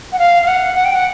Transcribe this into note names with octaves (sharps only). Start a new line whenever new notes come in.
F#5
F5
F5
F#5
F#5
G5
F#5